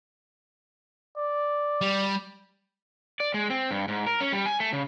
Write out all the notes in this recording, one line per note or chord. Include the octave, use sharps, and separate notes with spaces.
D5
G3
D5
G#3
C4
G2
G#2
A#4
C#4
G3
G#5
A3
C#3